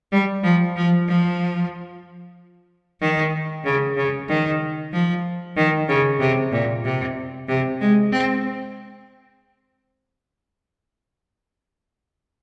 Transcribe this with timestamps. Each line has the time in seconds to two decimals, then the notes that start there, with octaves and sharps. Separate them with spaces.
0.12 G3
0.44 F3
0.76 F3
1.08 F3
3.01 D#3
3.64 C#3
3.97 C#3
4.28 D#3
4.92 F3
5.57 D#3
5.89 C#3
6.20 C3
6.52 A#2
6.84 C3
7.49 C3
7.81 G#3
8.12 C4